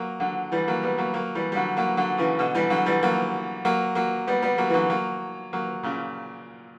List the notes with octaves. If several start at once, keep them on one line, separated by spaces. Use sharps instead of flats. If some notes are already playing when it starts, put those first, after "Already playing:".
Already playing: F#3 A#3
D3 F#3
E3 G3
F#3 A#3
G3 B3
F#3 A#3
F#3 A#3
E3 G3
G3
D3 F#3
F#3 A#3
D3 F#3
C#3 E3
B2 D3
E3 G3
D3 F#3
E3 G3
F#3 A#3
F#3 A#3
F#3 A#3
G3 B3
G3 B3
F#3 A#3
E3
D3 F#3
F#3 A#3
F#3 A#3
A#2 C#3